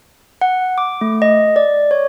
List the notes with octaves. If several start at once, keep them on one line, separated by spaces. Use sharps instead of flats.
F#5
D6
A3
D#5
D5
C#5